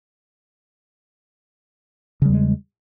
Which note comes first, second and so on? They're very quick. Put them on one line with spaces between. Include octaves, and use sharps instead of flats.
C#3 G3 E2 G#3